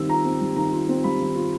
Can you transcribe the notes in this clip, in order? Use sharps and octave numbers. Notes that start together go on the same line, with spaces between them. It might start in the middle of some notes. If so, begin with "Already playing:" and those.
Already playing: D#3 G3 C4 E6
F4 A#5
C4
G3
D#3 A#5
F4
C4
G3 B5
D#3
F4